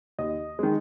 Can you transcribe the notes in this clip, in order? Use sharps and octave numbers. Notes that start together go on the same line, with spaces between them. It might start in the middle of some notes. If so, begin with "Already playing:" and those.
D#2 D#5
D#3 G#3